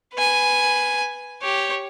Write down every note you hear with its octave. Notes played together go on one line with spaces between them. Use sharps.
B4 G#5
G4 C#5